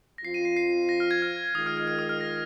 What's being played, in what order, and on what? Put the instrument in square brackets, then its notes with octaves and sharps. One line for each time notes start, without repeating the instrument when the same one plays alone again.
[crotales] A#6
[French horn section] F2 F3 C4 F4 [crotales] C7
[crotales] D#7
C7
C7
A#6
F6
G#6
F6
[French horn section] D#3 G#3 F4 [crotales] D#6
[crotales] F6
F6
F6
D#6
F6
A#6